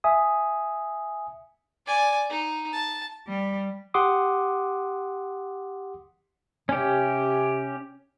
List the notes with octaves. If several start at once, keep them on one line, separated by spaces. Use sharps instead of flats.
E5 G#5 D#6
D5 G#5
D#4
A5
G3
G4 F#5 C6 D6 D#6
C3 C#4 G4